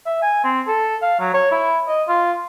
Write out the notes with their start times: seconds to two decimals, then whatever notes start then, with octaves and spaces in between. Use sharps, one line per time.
0.06 E5
0.22 G#5
0.44 C4
0.67 A4
1.02 F5
1.20 F#3
1.34 C#5
1.51 E4
1.88 D#5
2.08 F4